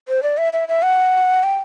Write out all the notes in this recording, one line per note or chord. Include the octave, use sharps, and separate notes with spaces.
C5
D5
E5
E5
E5
F#5
G5